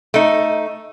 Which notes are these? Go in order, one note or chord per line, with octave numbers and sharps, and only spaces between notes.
A3 D#4